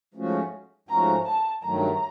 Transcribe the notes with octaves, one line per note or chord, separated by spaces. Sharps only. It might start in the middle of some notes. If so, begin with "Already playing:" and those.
G#2 F3 A3 C#4 F#4
G#2 F3 A3 C#4 F#4 A#5
A5
G2 D#3 F#3 A3 A#5